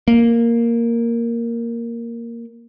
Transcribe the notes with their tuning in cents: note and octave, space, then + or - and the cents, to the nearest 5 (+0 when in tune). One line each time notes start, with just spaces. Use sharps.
A#3 +0